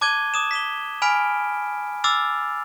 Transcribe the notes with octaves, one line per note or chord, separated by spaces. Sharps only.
A5 D6 F#6 G#6 D#7 G7
D6 D#6 E7
B6 E7 G7
G#5 B5 F6 B6 D7
D6 E6 F6 A6 C7 F7